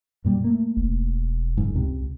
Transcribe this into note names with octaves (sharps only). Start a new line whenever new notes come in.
F#2 A#2 G3
A3 A#3
E1
F#1 G#2
C#2 C3